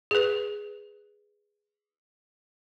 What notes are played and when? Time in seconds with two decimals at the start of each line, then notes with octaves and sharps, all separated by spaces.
0.11 G#4 B4